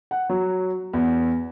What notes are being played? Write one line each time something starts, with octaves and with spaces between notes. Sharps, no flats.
F#5
F#3
E2